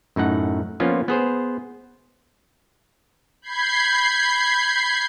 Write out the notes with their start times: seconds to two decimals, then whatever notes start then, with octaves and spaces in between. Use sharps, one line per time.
0.16 F#2 A2 D#4 F#5
0.80 F3 A#3 B3 C#4 F4
1.08 B3 G#4 C5
3.42 B5 G6 G#6 C7